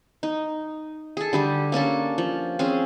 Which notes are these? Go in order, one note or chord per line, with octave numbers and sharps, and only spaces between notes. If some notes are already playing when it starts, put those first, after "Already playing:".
D#4
G#4 A4
D3 G3 G4
A#3 C#4 D4 A4
F3
C4 C#4 G#4